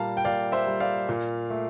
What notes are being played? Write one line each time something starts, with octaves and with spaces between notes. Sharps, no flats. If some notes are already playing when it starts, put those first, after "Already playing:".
Already playing: A#2 G3 F5 A5 A#5
G5
A#2 D5 F5
C5 E5
G3
D5 F5
A#2
A3